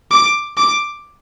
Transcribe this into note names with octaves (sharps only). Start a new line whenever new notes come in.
D6
D6